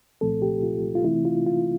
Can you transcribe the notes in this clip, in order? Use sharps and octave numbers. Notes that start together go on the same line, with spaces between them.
C2 A#2 F3 A3 C4 A4
G4
F4
F4
C3 E3 A3 C4 E4
F4
F4